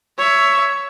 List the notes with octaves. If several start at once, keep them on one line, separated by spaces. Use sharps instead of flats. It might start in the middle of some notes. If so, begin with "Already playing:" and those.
C#5 E5